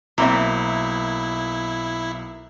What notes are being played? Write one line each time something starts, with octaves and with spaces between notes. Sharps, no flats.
B1 A#3 C4 E4 E5